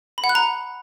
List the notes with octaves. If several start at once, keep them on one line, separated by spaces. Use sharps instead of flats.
B5
F#5
F#6
A#5